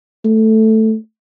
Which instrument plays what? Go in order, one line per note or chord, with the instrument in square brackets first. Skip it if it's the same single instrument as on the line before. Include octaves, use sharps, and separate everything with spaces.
[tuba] A3